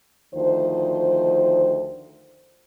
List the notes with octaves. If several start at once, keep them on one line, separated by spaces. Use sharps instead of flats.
D2 D#3 F3 C5